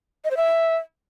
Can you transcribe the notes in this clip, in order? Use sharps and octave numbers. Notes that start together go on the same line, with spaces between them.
D#5
C5
E5